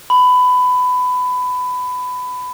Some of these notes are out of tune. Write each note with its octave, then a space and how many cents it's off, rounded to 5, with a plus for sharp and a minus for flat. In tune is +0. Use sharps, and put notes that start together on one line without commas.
B5 +20